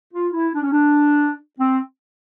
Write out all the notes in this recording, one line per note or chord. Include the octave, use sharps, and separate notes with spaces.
F4
E4
D4
C#4
D4
C4